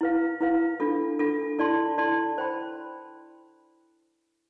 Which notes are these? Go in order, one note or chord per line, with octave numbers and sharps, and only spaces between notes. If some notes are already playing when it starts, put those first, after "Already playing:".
E4 B4 F5
E4 B4 F5
D4 F4 A4
D4 F4 A4
E4 A4 D5 A5 C6
E4 A4 D5 A5 C6
C5 G5 B5